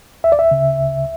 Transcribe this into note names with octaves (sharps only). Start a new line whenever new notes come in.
D2 E5
D5
E5
C#3
D2